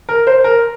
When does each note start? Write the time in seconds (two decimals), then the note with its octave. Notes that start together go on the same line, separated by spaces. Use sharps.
0.09 A#4
0.27 C5
0.44 A#4